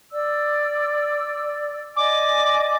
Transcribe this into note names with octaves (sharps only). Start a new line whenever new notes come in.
D5 E6
D5 D#5 G#5 D6